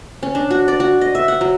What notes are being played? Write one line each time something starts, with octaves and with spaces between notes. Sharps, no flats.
C#4
D4
F#4
D5
F#4
D#5
E5
F#5
F#3